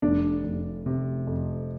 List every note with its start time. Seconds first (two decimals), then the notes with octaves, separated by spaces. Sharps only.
0.02 F1 D4
0.44 F1
0.86 C3
1.27 F2